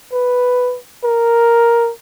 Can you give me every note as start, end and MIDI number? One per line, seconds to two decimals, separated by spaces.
0.12 0.78 71
1.04 1.91 70